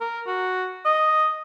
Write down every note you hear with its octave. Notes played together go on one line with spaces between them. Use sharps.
A#4
F#4
D#5